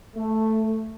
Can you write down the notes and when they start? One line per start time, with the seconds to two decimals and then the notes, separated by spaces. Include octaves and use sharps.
0.17 A3